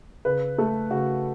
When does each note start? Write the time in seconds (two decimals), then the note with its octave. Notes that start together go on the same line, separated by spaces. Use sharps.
0.25 C#3 B4
0.58 A3 A4
0.91 C#3 F#4